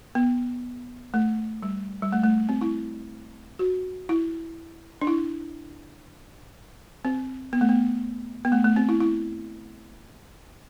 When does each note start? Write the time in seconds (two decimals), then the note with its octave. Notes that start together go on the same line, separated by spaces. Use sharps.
0.15 B3
1.14 A3
1.63 G3
2.02 G3
2.12 A3
2.24 A3
2.49 C4
2.61 E4
3.59 F#4
4.09 E4
5.01 D4
5.07 E4
7.05 C4
7.53 B3
7.61 A3
7.69 B3
8.45 B3
8.52 A3
8.65 A3
8.76 C4
8.89 E4
9.00 E4